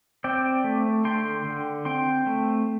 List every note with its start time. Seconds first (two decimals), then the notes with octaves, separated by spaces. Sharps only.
0.24 C4 D5 G5
0.64 A3
1.05 D3 G5 C6
1.45 D3
1.85 C4 G5 C6
2.27 A3